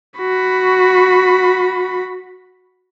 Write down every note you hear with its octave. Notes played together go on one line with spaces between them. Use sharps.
F#4 B5